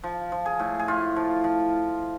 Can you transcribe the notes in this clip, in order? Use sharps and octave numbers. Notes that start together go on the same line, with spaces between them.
F3
F3
G#4
A2
G#4
A2 F4
F3
F3